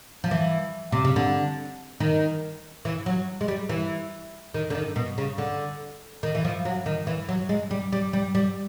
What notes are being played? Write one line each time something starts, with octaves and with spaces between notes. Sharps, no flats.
F3
E3
C3
C#3
D3
D#3
E3
F#3
G#3
G3
E3
D#3
D3
D#3
B2
C#3
D3
D#3
E3
F3
F#3
D#3
E3
F#3
G#3
G3
G3
G3
G3